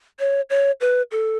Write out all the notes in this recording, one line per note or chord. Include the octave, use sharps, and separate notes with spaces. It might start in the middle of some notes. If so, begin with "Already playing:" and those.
C#5
C#5
B4
A4